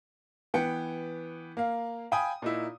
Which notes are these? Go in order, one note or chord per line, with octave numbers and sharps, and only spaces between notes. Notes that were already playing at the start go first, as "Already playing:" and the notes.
E3 B3 G5 C#7
A#3 F5
F5 G5 G#5 B5 D#6
A#2 D#4 E4